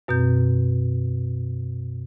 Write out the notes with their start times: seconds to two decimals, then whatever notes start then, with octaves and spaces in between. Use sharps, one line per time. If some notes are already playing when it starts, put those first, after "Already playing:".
0.08 F#2 B2 C4 G6